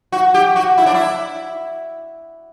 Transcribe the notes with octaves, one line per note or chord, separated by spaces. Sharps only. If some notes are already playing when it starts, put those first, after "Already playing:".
F#4
G4
F#4
E4
D4
E4